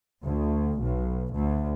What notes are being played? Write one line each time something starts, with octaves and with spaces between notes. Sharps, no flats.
D2
B1
D2